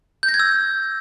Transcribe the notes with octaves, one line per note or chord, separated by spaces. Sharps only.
G6
A#6
G#6
E6